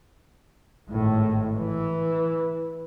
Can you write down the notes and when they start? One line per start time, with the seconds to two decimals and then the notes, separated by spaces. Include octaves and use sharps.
0.89 G#1 A2
1.57 E3